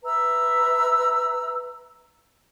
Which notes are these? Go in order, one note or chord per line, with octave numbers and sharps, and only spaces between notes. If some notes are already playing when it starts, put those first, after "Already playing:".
B4 E5 A#5 E6